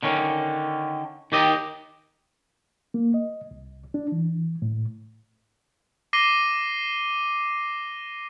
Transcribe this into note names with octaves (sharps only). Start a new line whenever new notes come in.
D3 D#3 C#4
D#3 G4 D#5
A#3
D#5
C2
D4
E3
A2
D6 A#6 C7 D#7 G7